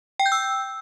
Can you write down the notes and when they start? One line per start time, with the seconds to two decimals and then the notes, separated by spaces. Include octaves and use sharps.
0.19 G5
0.26 G6
0.32 E6